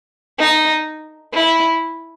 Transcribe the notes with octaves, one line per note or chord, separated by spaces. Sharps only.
D#4
E4